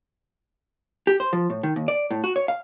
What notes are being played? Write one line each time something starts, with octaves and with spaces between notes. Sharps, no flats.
G4
C5
F3
A2
D#3
D#2
D5
A2
F#4
C#5
F5